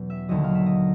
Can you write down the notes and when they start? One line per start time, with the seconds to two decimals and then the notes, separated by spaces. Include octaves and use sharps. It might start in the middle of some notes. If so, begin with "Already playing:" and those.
Already playing: E2 B2 F#3 C#4
0.10 E5
0.29 D#2 D3 F#3 D#5
0.44 F5
0.55 E5
0.66 D#5